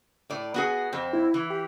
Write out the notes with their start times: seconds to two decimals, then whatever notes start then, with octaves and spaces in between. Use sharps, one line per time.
0.30 A2 D5
0.54 B3 F#4 G#4
0.92 F2 C4
1.13 E4
1.34 E3
1.50 G4